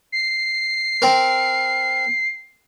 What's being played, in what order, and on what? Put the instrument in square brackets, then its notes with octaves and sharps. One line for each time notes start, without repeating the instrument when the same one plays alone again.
[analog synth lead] C7
[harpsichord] C4 A#4